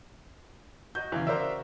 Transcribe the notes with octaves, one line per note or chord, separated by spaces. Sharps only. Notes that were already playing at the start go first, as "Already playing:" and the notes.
F#4 D#5 G6
E2 C#3 E3
C#3 F#4 A#4 C5 D5 E5